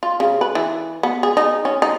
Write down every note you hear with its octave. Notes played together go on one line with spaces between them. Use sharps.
F4
C#3
B4
E3
B3
G#4
D#4
C#4
D#4